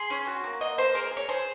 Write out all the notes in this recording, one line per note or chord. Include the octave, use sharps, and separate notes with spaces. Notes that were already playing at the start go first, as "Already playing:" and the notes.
Already playing: G#4 C6
C#4
F#4
A#3
A#3 D#5
A#3 C5
G#4 A#4
G#4
C#5
G#4 C5